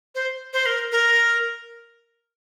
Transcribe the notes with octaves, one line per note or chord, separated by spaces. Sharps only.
C5
C5
A#4
A#4